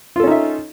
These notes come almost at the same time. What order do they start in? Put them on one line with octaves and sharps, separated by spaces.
F4 A4 C#4 D#4 E5